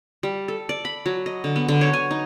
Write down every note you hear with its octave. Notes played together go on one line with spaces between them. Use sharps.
G3
A4
D5
B5
F#3
D#5
D3
B3
D3
C#5
G#5
D#4